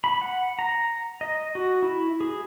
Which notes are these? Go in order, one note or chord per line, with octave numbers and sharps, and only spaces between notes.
B5
F#5
A#5
D#5
F#4
E4
G#4